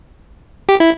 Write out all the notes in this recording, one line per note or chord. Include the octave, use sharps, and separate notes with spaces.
G4
E4